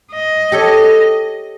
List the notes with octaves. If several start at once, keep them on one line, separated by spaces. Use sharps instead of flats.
D#5
G4 A4 C#5